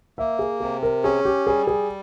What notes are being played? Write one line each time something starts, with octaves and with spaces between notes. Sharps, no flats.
A#3 E5
G#4
C3 G#4
A#4
C#4 G#4
G4
G3 G#4
G#4